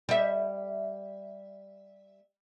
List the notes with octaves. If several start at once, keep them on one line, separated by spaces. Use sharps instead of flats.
G3 E5